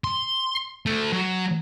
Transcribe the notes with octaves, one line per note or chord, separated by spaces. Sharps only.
C6
D3 A3
F#3